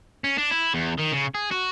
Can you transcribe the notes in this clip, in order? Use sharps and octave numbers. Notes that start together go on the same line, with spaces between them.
C#4
D4
E4
E2
D#3
C#3
G#4
F#4